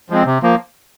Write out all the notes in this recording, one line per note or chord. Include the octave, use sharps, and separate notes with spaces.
F3 G#3 C4
C3
F3 A#3